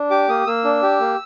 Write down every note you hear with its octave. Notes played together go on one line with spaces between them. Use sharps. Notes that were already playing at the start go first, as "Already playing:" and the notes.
Already playing: D4
G4 D6
A#3 D#6
A#3 E6
D4
G4
A#3